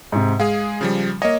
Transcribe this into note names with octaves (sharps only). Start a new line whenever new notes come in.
G#2 C3
G#3 G#4 F5
C#3 F3 G3
A#3 C#5 D#5